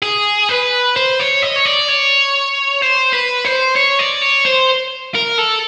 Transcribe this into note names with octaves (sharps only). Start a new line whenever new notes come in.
G#4
B4
C5
C#5
D#5
C#5
D5
C#5
C5
B4
C5
C#5
D5
C#5
C5
A#4
A4